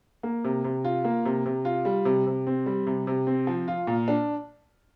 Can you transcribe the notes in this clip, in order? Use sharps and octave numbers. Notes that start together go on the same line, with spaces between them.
A#3
C3
C3
F4
A#3
C3
C3
F4
G3
C3
C3
C4
G3
C3
C3
C4
F3
F4
A#2
D4